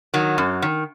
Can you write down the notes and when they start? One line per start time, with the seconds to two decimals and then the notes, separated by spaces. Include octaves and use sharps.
0.14 D#3 F#3
0.38 F#2
0.62 D#3